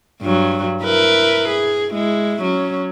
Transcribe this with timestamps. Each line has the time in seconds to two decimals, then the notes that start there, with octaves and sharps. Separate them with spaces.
0.21 G2 F#3
0.82 E4 A#4 B4
1.49 G#4
1.91 G#3 E4
2.42 F#3 C#4